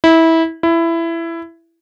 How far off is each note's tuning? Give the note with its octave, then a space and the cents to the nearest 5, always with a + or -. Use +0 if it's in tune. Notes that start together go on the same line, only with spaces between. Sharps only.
E4 -20
E4 +15